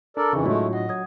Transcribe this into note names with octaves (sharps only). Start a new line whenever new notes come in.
D4 A4 A#4 D5
F2 C#3 E3 D#4 C#6
A2 F#3 G#3 A3 D4 F4 F#4
D#5 F#5
F#3 D#6 G#6